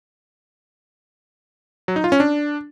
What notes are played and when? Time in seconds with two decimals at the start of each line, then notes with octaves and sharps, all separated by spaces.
1.88 F#3
1.96 D#4
2.04 F4
2.12 C#4
2.20 D4